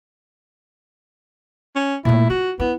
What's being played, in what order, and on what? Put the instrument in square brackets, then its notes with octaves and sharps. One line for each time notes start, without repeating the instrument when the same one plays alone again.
[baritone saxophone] C#4
[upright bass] A#2 A3 [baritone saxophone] E4
[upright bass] F4 [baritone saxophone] F#4
[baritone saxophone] B3 [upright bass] E4